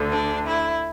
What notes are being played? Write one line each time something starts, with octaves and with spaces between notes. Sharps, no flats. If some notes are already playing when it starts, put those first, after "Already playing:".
Already playing: D2 D3
D4
E4